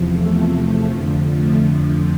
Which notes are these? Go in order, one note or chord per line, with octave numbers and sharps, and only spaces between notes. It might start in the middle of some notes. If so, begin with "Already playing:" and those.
Already playing: E2 C3 F3
A3
F2 D3 F3
A3